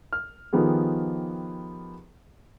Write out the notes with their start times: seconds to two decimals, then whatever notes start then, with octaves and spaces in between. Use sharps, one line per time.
0.13 F6
0.53 D#3 F3 B3 G4 G#4